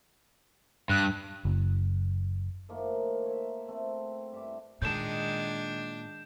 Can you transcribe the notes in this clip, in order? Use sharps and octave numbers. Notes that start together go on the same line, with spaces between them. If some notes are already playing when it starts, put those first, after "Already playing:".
G2 F#6
F#1
D#3 F3 A3 A#3
C#5 E5
A3 B3 C4
G2 E5 D6
A#2 D#3 G#3 D4 G6 E7